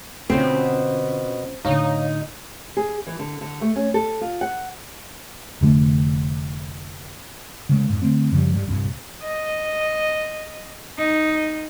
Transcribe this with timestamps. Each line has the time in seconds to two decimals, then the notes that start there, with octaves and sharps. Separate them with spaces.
0.30 B2 D3 C4 C#4 F4 G6
1.65 A2 D3 D#4 C#5 F5 A#5
2.77 G#4
3.07 E3
3.19 D3
3.41 D3
3.61 A3
3.76 C#4
3.94 A4
4.21 F4
4.41 F#5
5.61 F1 D3 A3
7.69 C#3 G#3 A#3
7.90 F2 G#2
8.02 D3 A3 C4
8.31 F#2 C#3 F3 G3
8.54 G2 G3
8.67 C2 G2 A#2
9.22 D#5
10.98 D#4